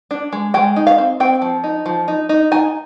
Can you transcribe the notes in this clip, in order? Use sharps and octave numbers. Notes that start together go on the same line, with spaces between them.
D4
G#3
G#3 G5
D#4
F5
C4
C4 G5
F3
D#4
F3
D#4
D#4
D#4 G#5